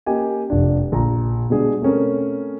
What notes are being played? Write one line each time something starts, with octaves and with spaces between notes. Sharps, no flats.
A#3 C#4 G4 D#5 G#5
F1 D4
A#1 A#5
B2 G3 G#3 D4 G#4
A3 C4 C#4 A#4